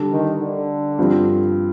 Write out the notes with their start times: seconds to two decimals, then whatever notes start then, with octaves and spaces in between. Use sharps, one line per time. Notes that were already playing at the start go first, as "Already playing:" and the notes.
Already playing: D3 G3 D4 A4
0.12 D#3
0.41 D3
0.99 G2 F3 C4